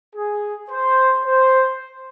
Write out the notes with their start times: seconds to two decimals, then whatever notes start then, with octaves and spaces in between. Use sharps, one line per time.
0.14 G#4
0.70 C5
1.26 C5